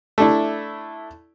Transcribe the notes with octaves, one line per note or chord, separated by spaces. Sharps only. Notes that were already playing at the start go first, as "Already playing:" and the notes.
A3 D4 E4